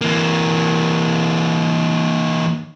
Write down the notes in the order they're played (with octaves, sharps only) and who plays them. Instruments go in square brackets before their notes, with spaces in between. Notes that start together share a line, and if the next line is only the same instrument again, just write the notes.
[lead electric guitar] E3 A#3